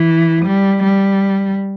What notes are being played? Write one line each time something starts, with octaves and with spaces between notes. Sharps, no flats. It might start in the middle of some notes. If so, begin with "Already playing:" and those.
Already playing: E3
G3
G3